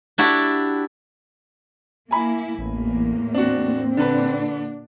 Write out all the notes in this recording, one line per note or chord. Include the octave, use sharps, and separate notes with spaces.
D4 E4 F#4 G4
A#3 E4 G#5 B5
A1 E2 A2 A#3
C4 D4 F#4
A#2 D3 D4 B4